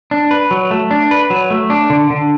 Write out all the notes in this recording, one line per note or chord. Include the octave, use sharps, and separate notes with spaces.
D4
B4
F#3
A3
D4
B4
F#3
A3
D4
D3
D3